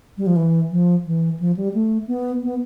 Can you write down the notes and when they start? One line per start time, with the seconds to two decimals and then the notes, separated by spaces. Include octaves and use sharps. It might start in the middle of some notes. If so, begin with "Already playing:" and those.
0.18 G3
0.27 F3
0.36 E3
0.71 F3
1.06 E3
1.40 F3
1.57 G3
1.74 A3
2.08 B3
2.43 B3